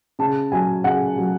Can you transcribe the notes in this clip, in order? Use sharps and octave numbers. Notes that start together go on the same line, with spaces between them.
C#3 A5
F#3 G#5
C#3 F#5
F#3